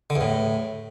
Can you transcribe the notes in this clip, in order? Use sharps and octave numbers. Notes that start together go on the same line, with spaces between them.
D3
E2
A2